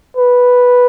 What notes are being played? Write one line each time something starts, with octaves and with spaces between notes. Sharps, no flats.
B4